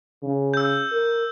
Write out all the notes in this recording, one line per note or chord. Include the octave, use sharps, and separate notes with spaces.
C#3
E6 G6
A#4